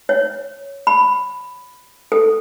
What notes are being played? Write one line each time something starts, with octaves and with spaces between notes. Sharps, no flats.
C#5
B5
A4